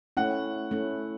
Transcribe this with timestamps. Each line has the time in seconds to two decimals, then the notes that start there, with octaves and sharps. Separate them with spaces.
0.17 A3 C#4 E4 F#5
0.71 A3 C#4 E4